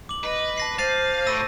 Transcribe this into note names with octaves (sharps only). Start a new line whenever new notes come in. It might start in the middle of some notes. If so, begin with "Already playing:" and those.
D6 F#7
B4 D#5
A5 A#6 C7
C5 F5 A6 C7 D#7
A2 E6 A#6 D#7